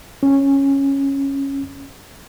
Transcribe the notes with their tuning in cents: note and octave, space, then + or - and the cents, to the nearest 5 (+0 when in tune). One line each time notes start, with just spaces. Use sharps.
C#4 -10